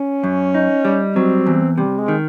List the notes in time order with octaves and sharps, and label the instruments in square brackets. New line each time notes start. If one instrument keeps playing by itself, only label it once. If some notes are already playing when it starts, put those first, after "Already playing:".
Already playing: [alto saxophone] C#4
[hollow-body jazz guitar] F#2
D#4
G3
[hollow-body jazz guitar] F#3 [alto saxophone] C4
[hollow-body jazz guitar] E2
[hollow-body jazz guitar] C3 [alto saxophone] G3
[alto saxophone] G#3
[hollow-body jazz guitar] D#3